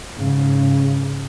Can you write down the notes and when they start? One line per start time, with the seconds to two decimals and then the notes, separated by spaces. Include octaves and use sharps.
0.16 G#2 C#3